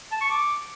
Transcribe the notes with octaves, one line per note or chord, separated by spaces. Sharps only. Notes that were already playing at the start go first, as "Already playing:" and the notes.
A5
C#6
D6